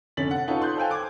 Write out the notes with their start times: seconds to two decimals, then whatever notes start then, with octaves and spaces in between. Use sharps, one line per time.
0.17 F1 D3 C#4 A6 B6 F#7
0.31 F#5
0.48 C#4 D#4 F4 A4 B4 C#5
0.62 C6 F#6 G6
0.76 A4 C5 F5 G5 G#5
0.91 D6 G#6